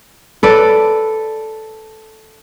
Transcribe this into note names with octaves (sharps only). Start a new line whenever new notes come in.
A4 B4 D5